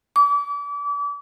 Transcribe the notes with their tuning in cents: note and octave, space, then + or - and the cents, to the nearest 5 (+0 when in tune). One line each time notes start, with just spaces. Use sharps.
D6 -35